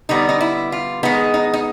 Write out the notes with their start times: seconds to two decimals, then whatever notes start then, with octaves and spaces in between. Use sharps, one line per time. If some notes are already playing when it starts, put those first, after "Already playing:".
0.09 D3 G3 B3 D#4
0.29 D#4
0.41 E4
0.72 F4
1.03 D#3 G#3 B3 D#4
1.34 D#4
1.54 D#4